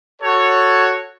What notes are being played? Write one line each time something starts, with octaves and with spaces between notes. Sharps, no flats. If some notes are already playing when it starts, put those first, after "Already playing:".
F#4 A4 C#5